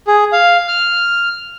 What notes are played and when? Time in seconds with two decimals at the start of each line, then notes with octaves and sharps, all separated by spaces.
0.07 G#4
0.32 F5
0.68 F6